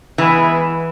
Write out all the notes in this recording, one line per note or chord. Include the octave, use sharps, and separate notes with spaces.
E3 G#3 B3 E4